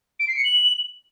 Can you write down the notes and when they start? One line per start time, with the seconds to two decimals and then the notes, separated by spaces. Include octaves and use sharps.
0.20 D7
0.28 C7
0.36 C#7
0.45 F#7